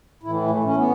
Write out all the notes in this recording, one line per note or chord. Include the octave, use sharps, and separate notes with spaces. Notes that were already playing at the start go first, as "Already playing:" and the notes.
A2 E3 E4
A3
C#4
B3